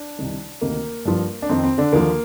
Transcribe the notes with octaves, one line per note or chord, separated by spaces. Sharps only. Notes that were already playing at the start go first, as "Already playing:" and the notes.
Already playing: D4
C2 C3 D#3
D2 C3 D#3 A#3
G2 F3
D4
F2 D#3 C4
C4
D3 D4
D#2 D3 F3 A#3